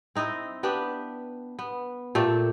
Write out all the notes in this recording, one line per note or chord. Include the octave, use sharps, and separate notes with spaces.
C4 D#4 E4 D#5
B3 D4 G4 B4
B3
A#2 A3 G4 A4